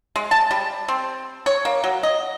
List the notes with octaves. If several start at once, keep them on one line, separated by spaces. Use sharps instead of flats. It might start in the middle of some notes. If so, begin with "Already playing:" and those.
G#3
A5
G3
C4
C#5
A#3
F#3
D#5